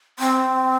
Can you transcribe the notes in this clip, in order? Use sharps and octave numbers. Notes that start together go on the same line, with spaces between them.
C4